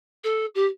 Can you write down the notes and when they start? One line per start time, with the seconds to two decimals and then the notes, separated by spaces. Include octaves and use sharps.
0.24 A4
0.55 G4